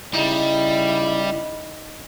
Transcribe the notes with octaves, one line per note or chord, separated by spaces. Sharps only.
C#3 G3 D#4 E4